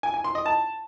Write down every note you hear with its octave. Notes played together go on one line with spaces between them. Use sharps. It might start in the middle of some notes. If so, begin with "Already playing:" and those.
G#5
G#5
C6
D#5
A5